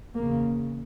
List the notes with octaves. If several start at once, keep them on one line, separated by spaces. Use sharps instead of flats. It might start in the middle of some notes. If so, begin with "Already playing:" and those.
E2 C#3 A#3